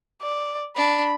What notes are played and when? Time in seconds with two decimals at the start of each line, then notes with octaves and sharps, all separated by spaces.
0.22 D5
0.76 D4 B5